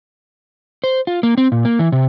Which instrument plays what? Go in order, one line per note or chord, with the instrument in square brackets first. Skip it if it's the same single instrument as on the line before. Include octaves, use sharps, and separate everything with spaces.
[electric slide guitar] C5
F4
A#3
C4
A#2
A#3
E3
C3